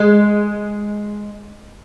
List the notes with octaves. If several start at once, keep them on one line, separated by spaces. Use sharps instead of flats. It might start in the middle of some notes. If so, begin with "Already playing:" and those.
Already playing: G#3